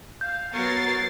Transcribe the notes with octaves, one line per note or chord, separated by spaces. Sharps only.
F5 G6
F#3 B3 A#4 C#5 A6 C7